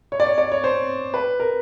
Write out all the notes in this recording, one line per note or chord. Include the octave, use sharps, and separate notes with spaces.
C#5
D5
C#5
D5
C#5
C5
B4
A#4